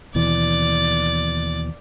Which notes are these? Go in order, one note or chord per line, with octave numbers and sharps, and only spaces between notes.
D#2 B2 E3 D5 A6